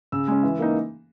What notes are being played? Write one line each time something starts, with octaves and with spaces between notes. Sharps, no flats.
C#3 E6
G#3 C#4
E3
A#3 D#4